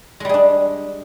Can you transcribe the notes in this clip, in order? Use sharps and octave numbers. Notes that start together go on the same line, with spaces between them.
G3 G#3 D4 G#4